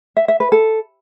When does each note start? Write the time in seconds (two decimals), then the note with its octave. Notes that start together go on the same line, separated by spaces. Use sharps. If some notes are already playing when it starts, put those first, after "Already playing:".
0.17 E5
0.28 E5
0.40 B4
0.52 A4